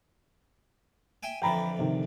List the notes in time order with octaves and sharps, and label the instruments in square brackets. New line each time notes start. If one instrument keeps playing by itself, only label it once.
[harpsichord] E5 G5 G#5
[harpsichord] F2 D3 E3 [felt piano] G5 A#5 B5
[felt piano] C3 D#3